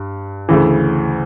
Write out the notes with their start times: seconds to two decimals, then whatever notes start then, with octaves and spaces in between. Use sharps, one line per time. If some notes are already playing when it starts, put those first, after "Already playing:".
Already playing: G2
0.49 D2 C#3 E3